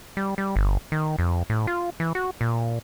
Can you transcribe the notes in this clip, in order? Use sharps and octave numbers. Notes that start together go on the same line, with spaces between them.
G3
G3
G1
D#3
F2
A2
F4
E3
F#4
A#2